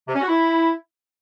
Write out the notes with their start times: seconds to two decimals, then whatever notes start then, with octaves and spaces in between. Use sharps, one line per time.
0.08 C3
0.14 C#4
0.21 F#4
0.28 E4